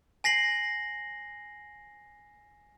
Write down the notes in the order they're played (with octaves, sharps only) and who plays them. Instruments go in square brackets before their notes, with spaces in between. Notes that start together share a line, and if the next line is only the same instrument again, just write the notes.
[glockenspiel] G#5 A#6 C7 F#7